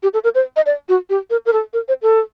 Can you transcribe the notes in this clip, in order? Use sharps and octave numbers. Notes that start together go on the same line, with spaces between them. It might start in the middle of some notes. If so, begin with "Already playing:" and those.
G4
A4
A#4
C5
D#5
D5
F#4
G4
A#4
A#4
A4
A#4
C5
A4